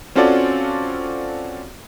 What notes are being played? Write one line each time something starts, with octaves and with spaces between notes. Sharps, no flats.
C4 C#4 F4 F#4 A4 D5